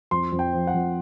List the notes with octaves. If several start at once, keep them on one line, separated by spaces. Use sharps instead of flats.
F2 C6
F2
G5
F3
F#5
F2